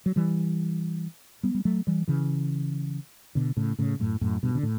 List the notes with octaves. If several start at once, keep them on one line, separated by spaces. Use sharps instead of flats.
F#3
E3 G3
G3 B3
G3
F#3 A3
E3 G3
C#3 E3
B2 D3
A2 C#3
A2 C#3
F#2 A2
F#2 A2
G2 B2
D3
A2